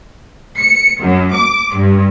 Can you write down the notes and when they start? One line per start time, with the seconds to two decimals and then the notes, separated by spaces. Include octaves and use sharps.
0.58 C#7
1.02 F#2
1.34 D6
1.75 G2